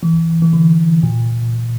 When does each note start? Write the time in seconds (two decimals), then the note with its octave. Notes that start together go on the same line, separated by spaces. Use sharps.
0.03 E3
0.42 E3
0.53 D3
1.03 A#2